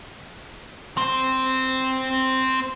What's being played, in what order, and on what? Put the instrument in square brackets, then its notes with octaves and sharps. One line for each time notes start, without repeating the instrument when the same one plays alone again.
[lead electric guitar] C4 C5